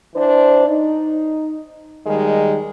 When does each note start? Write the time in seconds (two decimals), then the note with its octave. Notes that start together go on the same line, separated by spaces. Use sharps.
0.15 E3 D4 C5
0.67 D#4
2.06 D#2 D#3 G3 G#3